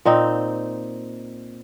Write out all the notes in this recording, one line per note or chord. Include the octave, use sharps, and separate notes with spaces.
A#2 C4 D#4